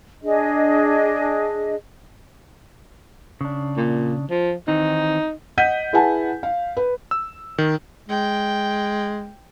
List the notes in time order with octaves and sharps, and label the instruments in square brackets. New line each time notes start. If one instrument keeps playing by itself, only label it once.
[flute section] D4 G#4 D#5
[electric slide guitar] C#3 D4
[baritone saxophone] A#2
F3
[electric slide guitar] D#3 E3 C4 [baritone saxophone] D#4
[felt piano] D#5 F#5 G6 B6 D#7
E4 G#4 B4 F#5 G#5 A5
F5
B4
[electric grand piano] E6
D#3
[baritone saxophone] G#3 [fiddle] G5